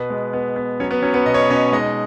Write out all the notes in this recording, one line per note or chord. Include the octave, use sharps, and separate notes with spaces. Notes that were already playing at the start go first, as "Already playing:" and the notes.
Already playing: B2 B3 B4
G#3
B3
B3
F#3 C#4 C#5
B3 B4
F#3 C#4 C#5
B3 B4
B2 D#5
C#5
B4
B2 C#4 C#5
G#3 D#4 D#5